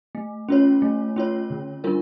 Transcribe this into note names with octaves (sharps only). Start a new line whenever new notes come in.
A3
C#4 F4 C#5
A3
C#4 F4 C#5
D3
G3 D4 F4 A#4